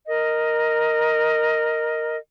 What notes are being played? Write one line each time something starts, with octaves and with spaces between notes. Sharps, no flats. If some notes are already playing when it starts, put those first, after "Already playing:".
A#4 D#5